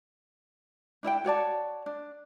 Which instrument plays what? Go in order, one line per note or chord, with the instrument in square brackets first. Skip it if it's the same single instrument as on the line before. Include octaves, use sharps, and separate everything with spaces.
[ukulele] D4 E4 E5 G5
F#4 C#5 D5 A5
D4